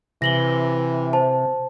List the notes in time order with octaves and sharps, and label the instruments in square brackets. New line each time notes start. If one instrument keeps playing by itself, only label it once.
[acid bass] C3 [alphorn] E3 [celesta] A#6 F#7 G7
[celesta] C5 A5